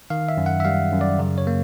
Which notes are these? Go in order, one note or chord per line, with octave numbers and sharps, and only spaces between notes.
D#3 F5
E5
F#2
F#5
E5
G3 F5
F#2
D5
C#3
C#5
A#3